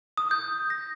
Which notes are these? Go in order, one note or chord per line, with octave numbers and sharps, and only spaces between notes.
D#6
G6
A#6